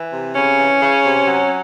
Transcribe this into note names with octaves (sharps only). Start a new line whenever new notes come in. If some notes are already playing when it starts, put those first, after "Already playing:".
Already playing: E3
C3
C#3 C#4
E3
C#3
C3
F#3